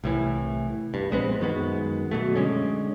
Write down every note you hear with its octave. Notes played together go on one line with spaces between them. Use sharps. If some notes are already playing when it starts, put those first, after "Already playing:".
C2 A2 E3
G2
A#1 G#3 B3 C4
F#2 D#3 G#3 B3
B2 F#3 A3
D3 G#3 C#4